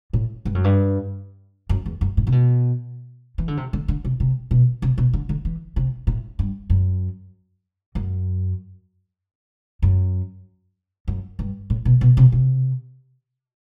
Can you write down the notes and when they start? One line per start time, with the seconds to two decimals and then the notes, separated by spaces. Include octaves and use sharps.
0.13 A2
0.45 G2
0.55 F#2
0.64 G2
1.69 F#2
1.86 E2
2.01 F#2
2.17 A2
2.27 C3
2.32 B2
3.38 E3
3.48 D3
3.57 C3
3.73 D3
3.88 D3
4.05 C3
4.20 C3
4.51 B2
4.82 C3
4.98 B2
5.13 D3
5.29 D3
5.45 E3
5.76 C3
6.07 A2
6.39 G2
6.70 F#2
7.95 F#2
9.82 F#2
11.08 F#2
11.39 G2
11.70 A2
11.85 B2
12.01 B2
12.17 C3
12.32 C3